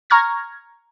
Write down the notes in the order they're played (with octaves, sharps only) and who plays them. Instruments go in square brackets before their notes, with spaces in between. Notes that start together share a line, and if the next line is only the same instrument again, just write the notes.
[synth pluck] A#5 C#6 F6 G#6 A#6